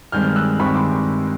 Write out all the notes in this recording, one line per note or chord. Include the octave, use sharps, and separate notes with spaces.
G2 D#3 G#3 C4 F6 G6
E6 F#6
G2 D#3 G#3 C4 B5 C#6
C6 D6